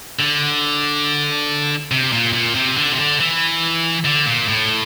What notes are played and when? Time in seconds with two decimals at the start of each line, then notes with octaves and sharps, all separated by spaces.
0.20 D3
1.91 C3
2.12 A#2
2.33 A#2
2.55 C3
2.77 D3
2.93 C3
2.98 D3
3.20 E3
4.05 D3
4.26 A#2
4.48 A2